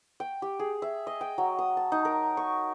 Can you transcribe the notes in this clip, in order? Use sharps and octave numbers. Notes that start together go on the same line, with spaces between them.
G5
G4
G#4
E5
D#5
G5
F#3
D#6
A5
D#4
A#4
C#6